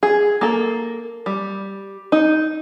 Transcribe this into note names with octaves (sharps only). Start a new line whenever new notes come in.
G#4
A#3 A4
G3
D#4